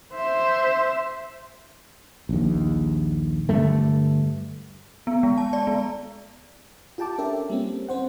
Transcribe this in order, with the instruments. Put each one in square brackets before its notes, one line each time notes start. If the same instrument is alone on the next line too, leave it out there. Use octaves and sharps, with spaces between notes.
[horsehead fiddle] C5 E5
[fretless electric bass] A#1 D#2
G2 D3 A3
[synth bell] B3
G#3
A5
D5
B3
[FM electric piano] F4 G4 G5 A5 D6
C#4 D4 A4 A#4 E5 G5
G3 A#3 C4 C#4
C4 C5 F#5